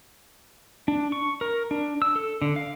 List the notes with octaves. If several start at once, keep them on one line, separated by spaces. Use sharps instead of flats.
D4
C#6
A#4
D4
E6
A4
D3
F5